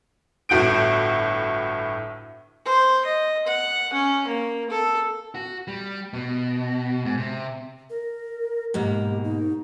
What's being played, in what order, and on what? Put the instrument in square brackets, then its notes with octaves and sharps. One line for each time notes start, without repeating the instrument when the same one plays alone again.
[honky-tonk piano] G1 A2 F#4 G6 D7
[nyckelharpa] C5
D#5
F#5
C#4
A#3
A4
[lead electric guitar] F#4
G3
B2
G#2
C3
[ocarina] A#4
[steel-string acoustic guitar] G#2 B2 A#3 [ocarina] G4
[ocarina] D#4